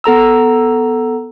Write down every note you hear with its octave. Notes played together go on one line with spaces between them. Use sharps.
B3 A4 A#5 E6